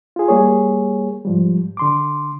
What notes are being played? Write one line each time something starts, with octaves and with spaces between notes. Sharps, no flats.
F4 G#4
G3 A#3 G#4 C#5
G#2 F3 G3
D3 C6 D6